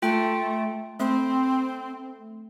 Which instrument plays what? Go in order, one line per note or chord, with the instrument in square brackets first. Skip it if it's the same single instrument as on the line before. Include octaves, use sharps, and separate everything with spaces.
[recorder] A3 [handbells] F4 G5
[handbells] A3 [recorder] C4